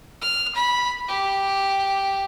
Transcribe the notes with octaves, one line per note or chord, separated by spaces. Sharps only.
F6
B5
G4